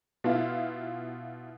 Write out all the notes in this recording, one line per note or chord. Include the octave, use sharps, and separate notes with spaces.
B2 B3 E4 F4